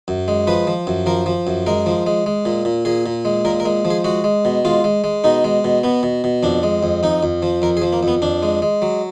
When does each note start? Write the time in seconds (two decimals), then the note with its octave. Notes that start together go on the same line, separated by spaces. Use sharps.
0.08 F#2
0.28 G#3
0.47 F3 B4
0.67 F3
0.87 F#2
1.06 F3 A#4
1.26 F3
1.47 F#2
1.66 G#3 A#4
1.86 F3
2.06 G#3
2.26 G#3
2.45 A#2
2.65 A#2
2.85 A#2 G#4
3.06 A#2
3.25 G#3
3.45 A#2 A#4
3.60 A#4
3.65 G#3
3.85 F3
3.90 G#4
4.04 G#3 F#4
4.24 G#3
4.45 B2
4.65 G#3 F4
4.84 G#3
5.04 G#3
5.24 B2 D#4
5.44 G#3
5.64 B2
5.83 B2 B3
6.03 B2
6.24 B2
6.43 F2 D4
6.63 G#3
6.83 F2
7.03 F2 D#4
7.23 F2
7.42 F3
7.62 F2 A#4
7.77 G#4
7.82 F3
7.93 A#3
8.03 F2 B3
8.22 F2 D4
8.43 G#3
8.62 G#3
8.82 F#3